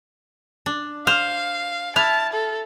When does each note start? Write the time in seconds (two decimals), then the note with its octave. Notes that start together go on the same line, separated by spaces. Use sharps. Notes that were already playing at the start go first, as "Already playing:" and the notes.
0.66 D4
1.07 C5 F5 F6
1.96 E4 A5 F6
2.33 A4